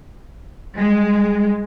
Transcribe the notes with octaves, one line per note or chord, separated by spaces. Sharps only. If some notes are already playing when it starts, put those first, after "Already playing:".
G3 G#3 G#4